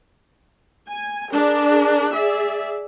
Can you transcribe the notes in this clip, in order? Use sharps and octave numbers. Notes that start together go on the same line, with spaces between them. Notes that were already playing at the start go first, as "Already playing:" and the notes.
G#5
D4 G#4 A#4
G#4 D5 E5